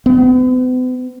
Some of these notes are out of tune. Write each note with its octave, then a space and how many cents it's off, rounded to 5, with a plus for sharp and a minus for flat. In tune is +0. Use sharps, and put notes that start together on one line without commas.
B3 +45